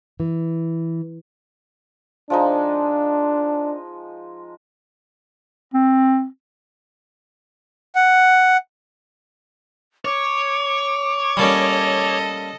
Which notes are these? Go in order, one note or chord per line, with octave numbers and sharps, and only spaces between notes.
E3
F3 G#3 D4 D#4
C4
F#5
C#5 D6
G3 A#3 C#4 A4 D#5